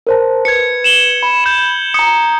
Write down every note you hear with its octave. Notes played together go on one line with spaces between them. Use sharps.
A#4 C5 A5
B4 G#6 C#7
E7 F#7 G7
B5
G6 E7
A#5 D#6 C#7